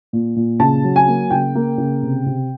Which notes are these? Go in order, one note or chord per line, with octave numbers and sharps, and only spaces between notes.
A#2
A#2
C#3 A5
F#3
G#5
A#3
C#3 G5
A#3
C#3
C3
C3